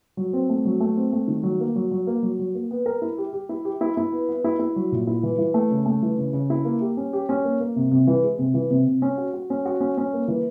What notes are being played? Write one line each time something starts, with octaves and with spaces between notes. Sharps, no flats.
F#3
C4
A3
F#3
A3
C4
A3
D#3
F#3
A#3
F#3
F#3
A#3
F#3
F#3
A#3
B3
A#4
E4
G4
G4
E4
G4
E4
E4
B3
B3
E4
E4
F#3
A#2
E4
E3
E3
A3
C#3
A3
E3
C#3
C#3
E4
A#3
G4
C#4
G4
C#4
A#3
A#3
C3
C3
E3
G#3
C3
E3
C3
C3
C#4
F#4
F#4
C#4
F#4
C#4
C#4
A#3
E3